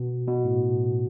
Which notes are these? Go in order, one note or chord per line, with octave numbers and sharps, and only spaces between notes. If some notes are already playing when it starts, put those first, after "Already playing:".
Already playing: B2
B2
A2